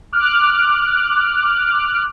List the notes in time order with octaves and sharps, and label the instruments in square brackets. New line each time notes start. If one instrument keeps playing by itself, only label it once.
[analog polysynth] D6 F6 F#6